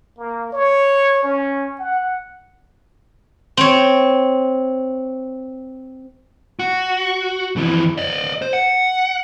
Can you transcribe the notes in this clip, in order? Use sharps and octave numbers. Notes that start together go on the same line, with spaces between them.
A#3
C#5
C#4
F#5
C4 C#5
F#4
F2 E3
D5 D#5
C5
F#5